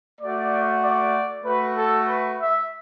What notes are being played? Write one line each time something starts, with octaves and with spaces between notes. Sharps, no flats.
A3 F#4 D5
D5
A3 F#4 B4
A4
B4
E5